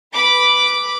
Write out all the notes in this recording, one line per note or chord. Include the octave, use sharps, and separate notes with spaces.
B4 B5 D6